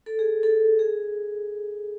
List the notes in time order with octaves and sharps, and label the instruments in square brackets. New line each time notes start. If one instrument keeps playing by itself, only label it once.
[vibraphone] A4
G#4
A4
G#4